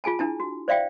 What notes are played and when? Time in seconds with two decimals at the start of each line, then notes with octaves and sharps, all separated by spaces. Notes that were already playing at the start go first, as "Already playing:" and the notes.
0.04 F4 G#4 G#5 A5
0.19 D4 E4 A5
0.40 F#4
0.68 C5 D5 E5 F5 G5